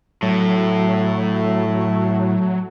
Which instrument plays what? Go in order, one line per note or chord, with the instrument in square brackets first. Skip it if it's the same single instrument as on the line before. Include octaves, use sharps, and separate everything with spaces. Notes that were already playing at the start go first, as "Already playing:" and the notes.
[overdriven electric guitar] A2 [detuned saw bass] F#3 [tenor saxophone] A3